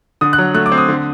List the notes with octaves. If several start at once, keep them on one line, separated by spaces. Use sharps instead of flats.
D3 D#6
F#6
F#3
A3 F#6
D6
C4
D#6
D3